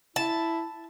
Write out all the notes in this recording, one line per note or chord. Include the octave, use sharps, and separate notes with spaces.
E4 A5